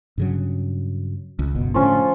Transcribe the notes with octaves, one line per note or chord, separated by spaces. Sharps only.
G2 C#3 F#3
C#2
F#1 B2
A2 D3 F3 C#4